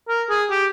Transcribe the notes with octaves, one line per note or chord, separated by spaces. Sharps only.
A#4
G#4
G4